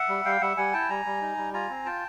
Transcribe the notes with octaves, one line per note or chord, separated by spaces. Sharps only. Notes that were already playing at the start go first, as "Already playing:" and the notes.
Already playing: E5 F#5
G3
G3 F5 G5
G3 E5 F#5
G3 F#5 G#5
E4 G5 A5
G3 G#5 A#5
G3
D#4
G3
F4 G#5 A#5
C4
F4 G5 A5